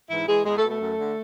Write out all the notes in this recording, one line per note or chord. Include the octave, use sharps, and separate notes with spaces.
G#2 E3 E4
E3 G#3 G#4
E2 G#3 G#4
A3 A4
B2
A3 A4
F#2
D3